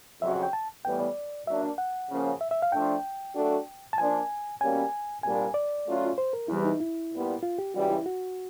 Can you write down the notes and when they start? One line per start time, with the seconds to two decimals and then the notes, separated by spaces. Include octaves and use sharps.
0.22 F2 C#3 F#3 E5
0.43 G5
0.53 A5
0.85 A2 E3 G3 B3 G5
1.00 D5
1.47 F#3 A#3 D4 E5
1.78 F#5
2.09 C#3 F3 A#3 C#4
2.41 E5
2.51 E5
2.62 F5
2.72 F3 A3 D4 G5
3.35 F#3 A3 D4 F#4 A4
3.93 A5
3.98 F3 A#3 D4 G#5
4.60 B2 G3 A#3 C#4 G#5
5.23 C2 A#2 G3 A#3 D4 G#5
5.54 D5
5.86 F#3 A3 C#4 F4
6.18 C5
6.33 A#4
6.48 E2 C3 E3 G3 E4
6.65 D#4
6.80 E4
7.12 A#2 G3 B3
7.43 F4
7.58 G4
7.74 C#2 C#3 E3 G3 F#4
7.90 E4
8.06 F#4